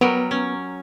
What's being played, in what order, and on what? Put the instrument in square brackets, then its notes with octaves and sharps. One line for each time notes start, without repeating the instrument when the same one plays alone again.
[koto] F#3 G3 A#4 [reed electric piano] B3
[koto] C#4